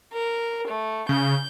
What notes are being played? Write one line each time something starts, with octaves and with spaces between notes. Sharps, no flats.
A#4
A3
C#3 G6